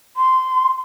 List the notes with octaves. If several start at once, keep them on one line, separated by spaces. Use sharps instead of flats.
C6